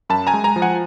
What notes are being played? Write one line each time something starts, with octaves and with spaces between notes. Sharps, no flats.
F#2 A5 B5
G#5 A#5
G#3
G#5 A#5
F3
F#5 G#5